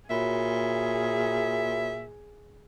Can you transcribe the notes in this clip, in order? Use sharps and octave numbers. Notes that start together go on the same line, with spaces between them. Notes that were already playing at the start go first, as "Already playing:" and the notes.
A#2 F#4 G#4 C#5 E5 B5